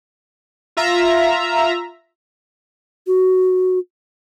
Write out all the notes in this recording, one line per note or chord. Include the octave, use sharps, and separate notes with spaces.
F4 E5 A#5
F#4